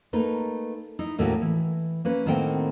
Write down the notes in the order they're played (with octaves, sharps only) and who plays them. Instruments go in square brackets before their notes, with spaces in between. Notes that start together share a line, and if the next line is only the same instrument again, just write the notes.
[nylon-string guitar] A3 A#3 D#4 B4
D#4 E4
D#2 A2 A#3 C#4 F#4 F5
E3
A#3 C#4 B4
A2 D#3 A#3 C4 F#5 G5